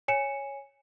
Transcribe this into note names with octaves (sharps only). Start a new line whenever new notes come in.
C#5 G#5 C#7 E7